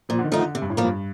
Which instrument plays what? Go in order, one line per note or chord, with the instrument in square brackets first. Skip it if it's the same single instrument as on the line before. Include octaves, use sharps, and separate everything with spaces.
[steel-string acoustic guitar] A#2 [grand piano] F3
[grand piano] D3
D#3
[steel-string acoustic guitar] F3 A3 D#4
[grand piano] D3
[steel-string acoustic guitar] C3
[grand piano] G2
A2
[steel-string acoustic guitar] F3 A#3
[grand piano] G2